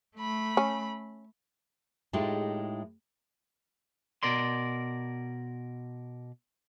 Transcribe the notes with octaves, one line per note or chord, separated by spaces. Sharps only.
A3 B5
C#4
A2 G#3 A3 D#4 F4 G4
B2 A#4 D5 C6